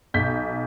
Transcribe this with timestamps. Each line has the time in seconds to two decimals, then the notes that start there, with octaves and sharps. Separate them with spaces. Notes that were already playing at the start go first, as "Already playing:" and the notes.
0.14 B1 G6 B6